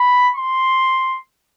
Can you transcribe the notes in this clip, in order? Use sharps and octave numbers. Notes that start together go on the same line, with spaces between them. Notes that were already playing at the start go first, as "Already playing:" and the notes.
Already playing: B5
C6